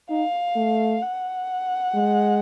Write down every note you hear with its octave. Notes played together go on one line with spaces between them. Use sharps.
D#4 F5
A3
F#5
G#3